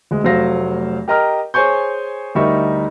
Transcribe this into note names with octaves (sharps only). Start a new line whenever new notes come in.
D2 G#3
F1 F#3 A3 C5 F5 A#6
G4 A#4 D#5 A#5 F6
G#4 C5 C#5 G#5 C#6 G6
D2 G3 D#4 A#4 E5 C#6